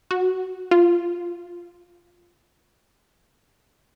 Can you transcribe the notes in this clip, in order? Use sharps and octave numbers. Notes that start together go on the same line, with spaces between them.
F#4
F4